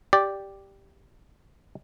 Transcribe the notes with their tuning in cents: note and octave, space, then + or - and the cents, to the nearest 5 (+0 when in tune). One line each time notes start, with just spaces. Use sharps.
G4 +0 D5 +0